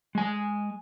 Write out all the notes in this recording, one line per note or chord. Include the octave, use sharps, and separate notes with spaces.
G#3 G#5